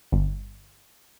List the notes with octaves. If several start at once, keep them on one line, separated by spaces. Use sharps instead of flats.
G1